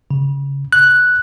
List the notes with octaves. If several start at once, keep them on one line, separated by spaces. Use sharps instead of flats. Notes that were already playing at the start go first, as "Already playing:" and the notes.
C#3
F#6